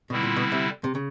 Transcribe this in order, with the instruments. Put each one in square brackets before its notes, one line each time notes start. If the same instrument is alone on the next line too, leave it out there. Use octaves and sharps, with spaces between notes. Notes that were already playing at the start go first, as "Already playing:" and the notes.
[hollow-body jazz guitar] B2 [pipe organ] D3 G3 C4 E4
[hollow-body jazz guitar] A#2
B2
C3
C3
C#3